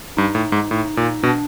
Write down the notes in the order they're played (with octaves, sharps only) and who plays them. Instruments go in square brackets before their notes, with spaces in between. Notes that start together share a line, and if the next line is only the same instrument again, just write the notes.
[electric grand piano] G2 [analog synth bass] D#4
[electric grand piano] A2
G#2
A2
A#2
[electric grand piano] B2 [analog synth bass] D4